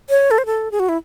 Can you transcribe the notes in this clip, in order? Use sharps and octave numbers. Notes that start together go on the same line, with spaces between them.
C#5
A4
C5
A4
G#4
F#4
E4